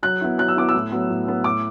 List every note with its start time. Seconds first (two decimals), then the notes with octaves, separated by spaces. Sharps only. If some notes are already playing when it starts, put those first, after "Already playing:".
0.03 F#3 F#6
0.21 B3 E4
0.38 F#3 F#6
0.48 E6
0.57 B3 E4 D6
0.69 E6
0.75 A2
0.92 F#3 B3
1.10 A2
1.27 F#3 B3
1.44 A2 D6